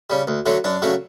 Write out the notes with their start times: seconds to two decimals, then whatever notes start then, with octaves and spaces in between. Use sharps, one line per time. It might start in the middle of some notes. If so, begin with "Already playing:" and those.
0.10 C#3 G3
0.27 D2
0.46 D3 F#3 A3
0.64 F#2 D4
0.82 C#3 F#3 A3